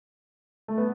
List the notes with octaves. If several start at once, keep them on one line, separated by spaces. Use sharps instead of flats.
A3
B3